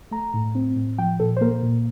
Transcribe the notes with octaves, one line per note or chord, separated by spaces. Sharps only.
A3 A#5
A2
C4
A2
F3 G5
A#2 A4
C5
A#3 A#4
A#2